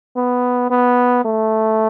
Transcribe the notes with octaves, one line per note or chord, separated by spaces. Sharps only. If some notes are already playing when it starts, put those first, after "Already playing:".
B3
B3
A3